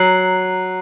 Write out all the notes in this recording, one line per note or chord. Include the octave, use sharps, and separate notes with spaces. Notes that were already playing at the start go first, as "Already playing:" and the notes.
Already playing: F#3 A#5 F#6 C7 F#7